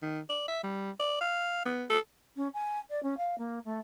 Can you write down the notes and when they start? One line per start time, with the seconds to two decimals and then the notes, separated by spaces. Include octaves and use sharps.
0.02 D#3
0.29 D5
0.48 E5
0.64 G3
0.99 D5
1.20 F5
1.65 B3
1.90 A4
2.36 C#4
2.54 G#5
2.90 D5
3.03 C#4
3.17 F5
3.38 A#3
3.65 A3